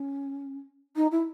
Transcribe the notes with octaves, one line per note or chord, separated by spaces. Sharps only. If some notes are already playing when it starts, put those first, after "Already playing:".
Already playing: C#4
D#4
E4